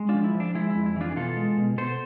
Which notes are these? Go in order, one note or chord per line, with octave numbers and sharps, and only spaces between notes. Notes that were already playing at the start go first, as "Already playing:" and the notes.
Already playing: G#3
D4 F4
F3
E4
F3
D4
G#3 E4
E4
F2
E4
E3 D4 F4
G#4
B2 F4 A4
G#3
B2
B2 A4 C5